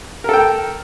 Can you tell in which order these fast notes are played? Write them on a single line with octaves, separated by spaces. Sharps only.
A#4 A4 G5